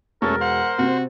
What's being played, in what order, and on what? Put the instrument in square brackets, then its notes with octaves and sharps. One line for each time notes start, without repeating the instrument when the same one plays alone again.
[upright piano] E1 A6 [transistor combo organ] A3 C#4 [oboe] A#4
[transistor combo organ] C5 [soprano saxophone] F#5
[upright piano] C3 C4 [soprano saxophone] F#4